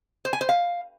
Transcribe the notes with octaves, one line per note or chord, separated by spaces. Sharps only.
C5
G#5
C5
F5